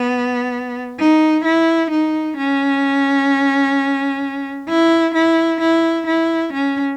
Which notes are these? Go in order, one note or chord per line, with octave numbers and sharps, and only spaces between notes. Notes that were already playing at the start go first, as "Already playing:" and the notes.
Already playing: B3
D#4
E4
D#4
C#4
E4
E4
E4
E4
C#4